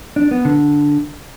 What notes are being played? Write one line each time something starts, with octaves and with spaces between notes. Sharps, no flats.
D4
B3
D3